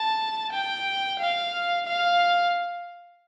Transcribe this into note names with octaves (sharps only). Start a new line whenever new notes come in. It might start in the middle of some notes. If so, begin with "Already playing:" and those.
Already playing: A5
G5
F5
F5